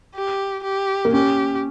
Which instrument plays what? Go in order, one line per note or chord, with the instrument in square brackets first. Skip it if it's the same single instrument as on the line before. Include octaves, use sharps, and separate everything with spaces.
[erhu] G4
G4
[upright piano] A#3
[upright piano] C#4 [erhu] G4